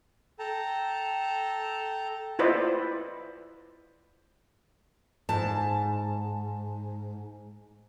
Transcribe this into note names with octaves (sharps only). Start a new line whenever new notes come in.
A4 G5 A5 A#5
E4 F4 B4 C5 D5 D#5
G#2 A5